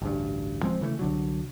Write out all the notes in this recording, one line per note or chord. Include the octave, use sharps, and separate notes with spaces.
A1 D2 G2
D1 F3 G#3 C4
C#3 E3 G3 A3
C2 D3 F#3